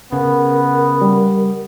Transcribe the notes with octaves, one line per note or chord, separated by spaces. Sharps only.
C#3 B3 A#4
G3